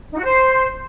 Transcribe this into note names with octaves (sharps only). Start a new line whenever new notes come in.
D#4
F#4
C5